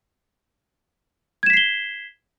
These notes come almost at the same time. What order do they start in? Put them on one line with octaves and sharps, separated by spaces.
G#6 E7 B6 C7 G7